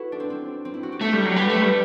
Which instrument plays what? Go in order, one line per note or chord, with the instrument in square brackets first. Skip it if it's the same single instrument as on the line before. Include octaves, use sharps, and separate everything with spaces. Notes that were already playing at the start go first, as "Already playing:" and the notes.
Already playing: [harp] E4 F#4 A4 B4
D4
C4
C4
C4
E4
F#4
G4
[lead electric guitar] A3 [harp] A4
[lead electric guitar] G3
F#3
[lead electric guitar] G3 [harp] B4
[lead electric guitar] A3 [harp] A4
[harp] B4
[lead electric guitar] G3 [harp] A4